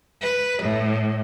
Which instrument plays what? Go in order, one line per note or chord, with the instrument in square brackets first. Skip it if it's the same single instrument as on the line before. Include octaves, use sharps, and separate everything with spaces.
[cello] B4
A2